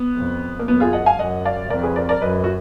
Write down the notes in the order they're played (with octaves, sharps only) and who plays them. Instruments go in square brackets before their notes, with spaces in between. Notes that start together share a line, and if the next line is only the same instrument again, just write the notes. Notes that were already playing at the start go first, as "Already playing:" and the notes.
Already playing: [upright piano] B3
[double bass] F2
[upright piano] A#3
[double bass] F#2 [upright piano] B3
[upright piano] F4 G#4
D#5 F#5
F5 G#5
[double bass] F#2 [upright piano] D#5 F#5
[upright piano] D5 F5
[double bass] F2 [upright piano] A#4 D5
[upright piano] G#4 B4
A#4 D5
A#4 D5
[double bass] F#2 [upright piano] B4 D#5
[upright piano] F#4